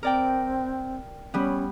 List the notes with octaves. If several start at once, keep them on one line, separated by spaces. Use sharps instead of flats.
C4 A#4 D5 G5
G3 B3 C#4